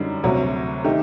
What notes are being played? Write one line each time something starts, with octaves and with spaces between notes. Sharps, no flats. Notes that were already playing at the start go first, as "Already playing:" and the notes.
Already playing: F#2 D3 G3 D#4
D2 C3 F#3
D#3 A3 D#4 G4